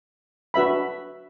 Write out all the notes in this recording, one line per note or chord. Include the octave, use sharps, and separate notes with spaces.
D4 F#4 B4 E5 B5